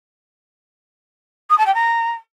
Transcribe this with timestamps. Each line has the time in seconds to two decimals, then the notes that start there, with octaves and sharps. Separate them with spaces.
1.50 D#6
1.58 A5
1.66 G5
1.74 A#5